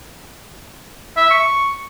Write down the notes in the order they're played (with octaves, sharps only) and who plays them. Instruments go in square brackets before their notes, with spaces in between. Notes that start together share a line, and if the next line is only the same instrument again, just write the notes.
[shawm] E5
C#6